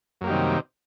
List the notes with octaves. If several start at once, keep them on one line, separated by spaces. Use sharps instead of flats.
F#2 C3 D#3 G3 A#3